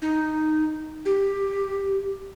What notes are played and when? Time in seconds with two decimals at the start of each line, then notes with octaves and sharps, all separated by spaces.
0.02 D#4
1.05 G4